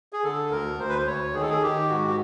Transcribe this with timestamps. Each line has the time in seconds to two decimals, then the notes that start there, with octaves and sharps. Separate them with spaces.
0.13 G#4
0.24 D3 A4
0.51 D2 A#4
0.79 D2 C5
0.89 B4
0.99 C5
1.07 D2 C#5
1.34 D#3 G#4
1.42 A4
1.50 G#4
1.62 D#3 G4
1.90 G#2 F#4
2.08 G4